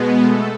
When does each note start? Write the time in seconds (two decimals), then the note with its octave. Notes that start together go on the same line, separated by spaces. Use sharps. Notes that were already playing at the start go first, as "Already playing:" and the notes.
Already playing: B2 G#3 B3
0.19 A3 A4